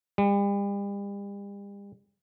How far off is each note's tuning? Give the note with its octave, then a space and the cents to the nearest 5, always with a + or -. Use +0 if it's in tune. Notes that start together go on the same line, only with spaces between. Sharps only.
G3 +40